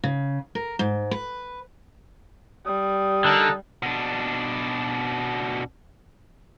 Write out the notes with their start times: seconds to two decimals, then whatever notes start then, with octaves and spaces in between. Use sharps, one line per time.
0.04 C#3
0.55 A#4
0.79 G#2
1.11 B4
2.66 G3 D#6
3.25 D3 D#4 A4 A#4
3.83 B2 D4